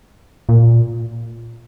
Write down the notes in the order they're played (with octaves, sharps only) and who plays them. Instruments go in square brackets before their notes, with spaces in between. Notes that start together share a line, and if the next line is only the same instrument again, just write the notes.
[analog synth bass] A#2